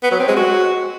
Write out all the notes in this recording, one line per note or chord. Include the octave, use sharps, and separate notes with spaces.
B3
F#3
C4
G#3
F#4